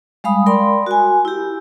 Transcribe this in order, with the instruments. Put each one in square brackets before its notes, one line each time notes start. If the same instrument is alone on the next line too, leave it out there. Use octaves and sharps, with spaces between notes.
[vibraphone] G3 G#3 F5 B5 D#6
A#4 D5 G5 B5 C6
F#4 G#5
E4 G4